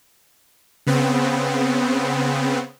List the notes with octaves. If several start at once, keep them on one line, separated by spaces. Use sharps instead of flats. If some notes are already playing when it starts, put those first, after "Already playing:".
C#3 B3 C4